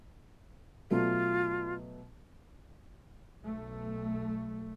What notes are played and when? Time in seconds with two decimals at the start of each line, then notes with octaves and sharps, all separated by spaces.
0.91 B2 F#3 A3 F4
3.43 B1 A3